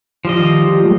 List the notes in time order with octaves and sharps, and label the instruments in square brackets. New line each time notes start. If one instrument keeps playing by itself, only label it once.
[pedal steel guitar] F3 G3 D#5
[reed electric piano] D#3
F4 G4
F#3 G#3 A3